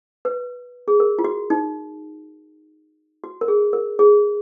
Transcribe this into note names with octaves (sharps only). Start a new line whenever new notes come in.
B4
G#4
A#4
F4
F#4
D#4
F#4
A#4
G#4
A#4
G#4